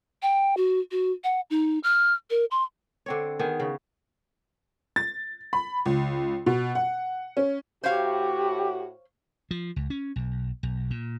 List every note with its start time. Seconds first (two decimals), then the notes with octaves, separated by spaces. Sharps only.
0.22 G5
0.57 F#4
0.91 F#4
1.24 F#5
1.50 D#4
1.84 F6
2.30 A#4
2.51 C6
3.06 D3 C4 C#5
3.39 D#3 B3 G#4
3.60 C#3
4.96 A6
5.53 B5
5.86 C#2
6.46 B2
6.75 F#5
7.37 C#4
7.83 A2 F#4 G4 C5 C#5 F5
9.51 F3
9.76 C#2
9.90 C#4
10.16 B1
10.63 B1
10.90 A#2